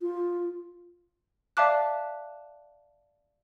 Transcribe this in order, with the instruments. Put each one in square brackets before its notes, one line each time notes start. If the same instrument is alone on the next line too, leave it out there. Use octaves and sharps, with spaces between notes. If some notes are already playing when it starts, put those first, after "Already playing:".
[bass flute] F4
[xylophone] D5 E5 F5 A5 D6 F#6